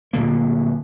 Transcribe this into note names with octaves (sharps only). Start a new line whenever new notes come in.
D1 A#2 D3 A#3